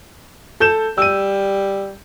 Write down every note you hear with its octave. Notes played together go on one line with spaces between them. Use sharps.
A4 G6 E7
G3 E6 D#7